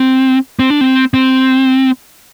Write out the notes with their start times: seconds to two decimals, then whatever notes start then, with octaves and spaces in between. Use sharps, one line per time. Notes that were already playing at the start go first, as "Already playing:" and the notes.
Already playing: C4
0.59 C4
0.70 D4
0.81 C4
1.14 C4